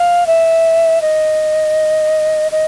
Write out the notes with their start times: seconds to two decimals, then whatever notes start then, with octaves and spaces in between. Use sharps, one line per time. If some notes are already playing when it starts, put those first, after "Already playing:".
Already playing: F5
0.27 E5
1.02 D#5
2.52 D#5